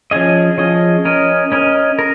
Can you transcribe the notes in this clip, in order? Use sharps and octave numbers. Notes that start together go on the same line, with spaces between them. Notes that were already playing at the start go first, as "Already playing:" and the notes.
F3 C#4 G#4 D#5
F3 C#4 G#4 D#5
C#4 A#4 D#5
C#4 A#4 D#5
A#4